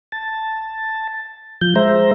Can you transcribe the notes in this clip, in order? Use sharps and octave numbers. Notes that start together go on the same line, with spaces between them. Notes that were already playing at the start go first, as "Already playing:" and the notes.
A5
F3 G6
G#3 C5 E5 A#5